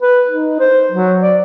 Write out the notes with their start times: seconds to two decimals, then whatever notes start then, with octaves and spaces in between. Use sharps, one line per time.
0.02 B4
0.29 D#4
0.60 C5
0.92 F#3
1.21 D5